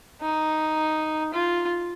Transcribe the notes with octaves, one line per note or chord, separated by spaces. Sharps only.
D#4
F4